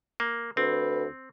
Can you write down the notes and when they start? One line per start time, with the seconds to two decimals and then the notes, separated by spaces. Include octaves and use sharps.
0.20 A#3
0.57 D2 C4 B4